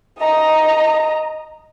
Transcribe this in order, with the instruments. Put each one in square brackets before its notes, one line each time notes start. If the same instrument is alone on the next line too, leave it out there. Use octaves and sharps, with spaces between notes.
[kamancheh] D#5 A#5